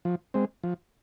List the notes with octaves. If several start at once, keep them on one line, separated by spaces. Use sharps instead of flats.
F3
G#3 C4
F3